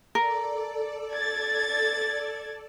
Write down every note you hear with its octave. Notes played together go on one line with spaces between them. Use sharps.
A4 A#4 D5
G#6 A6